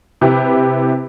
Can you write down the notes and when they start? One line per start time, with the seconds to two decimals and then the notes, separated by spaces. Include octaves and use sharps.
0.21 C3 E4 G4 B4